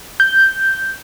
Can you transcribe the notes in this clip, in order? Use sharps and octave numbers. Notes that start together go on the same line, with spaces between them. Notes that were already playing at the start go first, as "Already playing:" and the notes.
G6